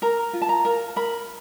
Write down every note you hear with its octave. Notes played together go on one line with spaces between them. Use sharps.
A#4 A#5
F4
A5
A#5
A#4
A#4 B5